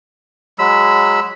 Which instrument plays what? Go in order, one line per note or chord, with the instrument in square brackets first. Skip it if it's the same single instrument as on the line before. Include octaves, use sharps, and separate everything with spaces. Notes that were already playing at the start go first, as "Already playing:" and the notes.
[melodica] F#3 G#3 B5 E6